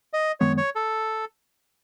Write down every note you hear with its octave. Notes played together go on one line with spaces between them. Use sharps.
D#5
F#2 D#3 G#3 B3 C#5
C#5
A4